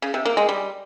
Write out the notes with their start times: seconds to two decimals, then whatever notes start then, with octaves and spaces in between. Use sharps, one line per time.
0.02 C#3
0.14 C3
0.25 A#3
0.37 G#3
0.49 G3